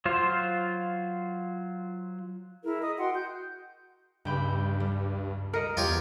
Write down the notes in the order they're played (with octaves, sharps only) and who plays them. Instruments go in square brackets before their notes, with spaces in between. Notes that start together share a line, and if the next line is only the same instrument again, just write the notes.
[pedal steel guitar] F#3 F4 C5
[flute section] E4 G#4 A#4
D#5 D#6
F#4 F#5 G5 C6
G6
[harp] C#2 G5 B5 [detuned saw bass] G2
[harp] G3
[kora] A#4 [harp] D#5 C#7
[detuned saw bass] E2 [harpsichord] F4 G4 C#5